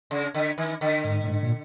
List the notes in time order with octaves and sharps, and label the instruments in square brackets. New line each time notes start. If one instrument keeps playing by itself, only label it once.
[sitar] C#3
D3
D#3
D3
[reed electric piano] G#2
A2
G#2
A#2